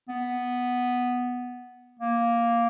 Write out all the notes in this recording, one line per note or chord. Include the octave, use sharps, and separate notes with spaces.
B3
A#3